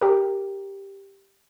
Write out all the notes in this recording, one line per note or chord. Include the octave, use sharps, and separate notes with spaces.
G4 A#4